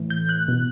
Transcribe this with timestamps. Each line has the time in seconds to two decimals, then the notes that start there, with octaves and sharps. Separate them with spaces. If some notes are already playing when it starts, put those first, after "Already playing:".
Already playing: A2 E3
0.10 G6
0.29 F#6
0.48 B2